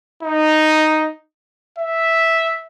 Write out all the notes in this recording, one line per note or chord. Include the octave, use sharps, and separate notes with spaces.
D#4
E5